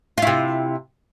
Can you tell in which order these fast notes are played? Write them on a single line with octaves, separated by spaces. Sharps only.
F4 E4 C3